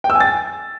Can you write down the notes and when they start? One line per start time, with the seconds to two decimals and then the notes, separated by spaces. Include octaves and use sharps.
0.04 G5
0.10 E6
0.15 G#5
0.20 A6